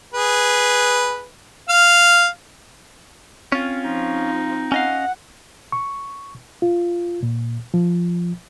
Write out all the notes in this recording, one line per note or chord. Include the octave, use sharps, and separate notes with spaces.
G#4 B4
F5 F6
C4 C#4 F4
F3 D#4
C#4 D#5 F5 F#5
C#6
F4
A#2
F3